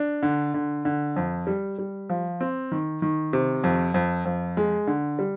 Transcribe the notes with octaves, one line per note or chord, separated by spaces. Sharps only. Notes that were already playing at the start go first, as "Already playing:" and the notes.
Already playing: D4
D3
D3
D3
F2
G3
G3
F3
C4
D#3
D#3
C3
F2
F2
F2
G#3
D3
G3